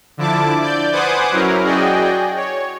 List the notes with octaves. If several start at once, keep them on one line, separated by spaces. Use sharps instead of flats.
D3 F3 E4 A5 D6
D5 G6
B4 C5 F#5 G#5 D6 D#6
F#3 C#4 E4 A#4
F#4 G#4 D5 D#5 G5
C#5